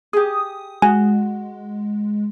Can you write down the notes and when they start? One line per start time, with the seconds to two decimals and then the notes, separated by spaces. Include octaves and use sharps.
0.13 G4 G#4 D#6
0.82 G#3 F#4 G#5